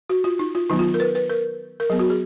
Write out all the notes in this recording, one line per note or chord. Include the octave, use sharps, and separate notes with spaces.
F#4
F4
D#4
F4
D#3 F#3 B3 D#4
F4
A#4
B4
B4
A#4
A#4
F#3 B3 G#4
F#4
G#4